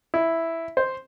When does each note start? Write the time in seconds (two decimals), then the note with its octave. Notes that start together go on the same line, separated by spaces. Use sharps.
0.14 E4
0.77 C5